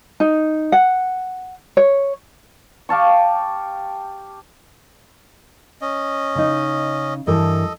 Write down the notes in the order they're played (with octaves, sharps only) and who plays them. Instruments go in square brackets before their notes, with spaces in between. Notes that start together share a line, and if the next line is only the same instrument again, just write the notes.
[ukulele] D#4
F#5
C#5
[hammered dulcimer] G4 F5 A5 C#6
[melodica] C#4 D#5
[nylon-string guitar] C#3 D#4
[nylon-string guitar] G2 E3 A#4 [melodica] A4 D#5